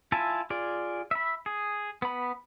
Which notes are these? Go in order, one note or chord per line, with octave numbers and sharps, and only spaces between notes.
E4 F4 E5 G#5 A5
F4 G#4 D5
E5 B5
G#4
B3 B5